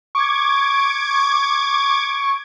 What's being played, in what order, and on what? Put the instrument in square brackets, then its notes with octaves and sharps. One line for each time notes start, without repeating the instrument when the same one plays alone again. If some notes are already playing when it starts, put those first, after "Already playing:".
[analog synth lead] C#6 [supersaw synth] D6 G#6